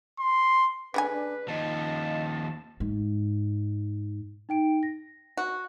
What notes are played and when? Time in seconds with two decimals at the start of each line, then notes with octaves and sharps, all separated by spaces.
0.19 C6
0.94 C#3 A3 D4 B4 G#5
1.11 D4
1.48 D#2 F3 D#5 A5
2.80 G#2
4.49 D#4 G5 D7
4.83 A#6
5.37 F#4